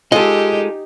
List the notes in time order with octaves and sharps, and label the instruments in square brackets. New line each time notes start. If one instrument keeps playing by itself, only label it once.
[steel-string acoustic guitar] G#3 [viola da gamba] D#4 G4 [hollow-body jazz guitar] F4 A4 [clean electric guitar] D#5